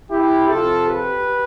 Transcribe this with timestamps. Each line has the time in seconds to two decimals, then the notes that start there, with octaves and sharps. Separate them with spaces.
0.10 E4 G4
0.49 C3 F3 F4 A4
0.87 G4 B4